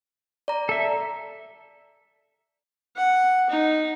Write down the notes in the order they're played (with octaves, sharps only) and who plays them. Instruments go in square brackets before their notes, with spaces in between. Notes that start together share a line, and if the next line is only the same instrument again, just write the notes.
[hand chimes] D5 A#5
[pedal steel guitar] A4 E5
[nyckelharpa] F#5
D#4